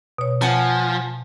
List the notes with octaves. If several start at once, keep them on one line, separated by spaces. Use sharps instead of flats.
B2 C#5
F3 F#5 G#5 A5